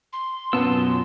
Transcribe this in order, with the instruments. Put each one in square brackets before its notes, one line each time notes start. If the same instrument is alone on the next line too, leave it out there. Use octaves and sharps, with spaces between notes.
[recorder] C6
[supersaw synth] F#2 B2 C#4 [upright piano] B3 [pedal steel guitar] F4 A5 E6